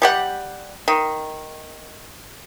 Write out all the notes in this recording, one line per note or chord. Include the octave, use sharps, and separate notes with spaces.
G3 G4 F#5
D#3